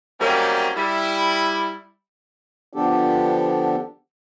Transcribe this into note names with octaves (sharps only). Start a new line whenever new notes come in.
F#3 G3 A#3 C4 C#4 D#4
G3 E4
D3 F3 B3 D4 G4 A4